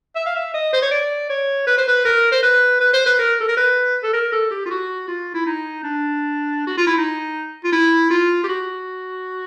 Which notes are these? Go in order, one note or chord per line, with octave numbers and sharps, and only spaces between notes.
E5
F5
E5
D#5
C5
C#5
D5
C#5
B4
C5
B4
A#4
C5
B4
B4
C5
B4
A#4
A4
A#4
B4
A4
A#4
A4
G4
F4
F#4
F4
E4
D#4
D4
F#4
F4
E4
D#4
F4
E4
F4
G4
F#4